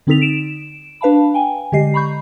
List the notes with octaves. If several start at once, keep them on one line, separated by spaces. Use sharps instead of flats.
D3 C4 D#4 A4 B6 F7
D7 E7
D4 B4 F5 A5 B5
G5 G#5
D3 G#3 G4 D#5 C7
A#5 B5 C#6 G6